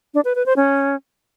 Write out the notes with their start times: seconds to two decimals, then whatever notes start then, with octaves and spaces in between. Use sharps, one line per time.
0.14 D4
0.25 B4
0.35 B4
0.46 C5
0.57 C#4